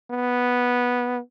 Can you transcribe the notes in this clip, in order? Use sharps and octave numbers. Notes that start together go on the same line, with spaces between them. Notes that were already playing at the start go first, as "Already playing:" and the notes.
B3